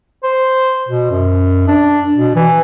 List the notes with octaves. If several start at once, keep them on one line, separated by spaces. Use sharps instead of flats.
C5
B2
F#2
D4
B2
E3